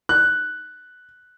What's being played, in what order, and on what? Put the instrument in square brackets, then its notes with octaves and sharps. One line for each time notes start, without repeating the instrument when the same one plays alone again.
[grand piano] F#6